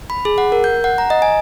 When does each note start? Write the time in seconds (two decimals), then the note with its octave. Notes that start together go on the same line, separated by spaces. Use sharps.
0.10 B5
0.25 G#4
0.38 F#5
0.52 A#4
0.64 G6
0.84 F#5
0.98 A#5
1.10 D#5
1.22 G#5